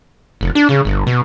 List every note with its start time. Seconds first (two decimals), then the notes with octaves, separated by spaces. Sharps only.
0.41 F1
0.55 D4
0.69 C#3
0.85 G1
1.06 B2